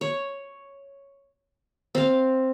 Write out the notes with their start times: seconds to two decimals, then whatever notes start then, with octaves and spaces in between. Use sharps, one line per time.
0.01 C#5
1.95 C4 F5